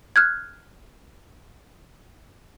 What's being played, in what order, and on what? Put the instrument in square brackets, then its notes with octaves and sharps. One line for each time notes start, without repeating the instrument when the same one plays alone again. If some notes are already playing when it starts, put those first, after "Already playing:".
[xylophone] F6 F#6 G#6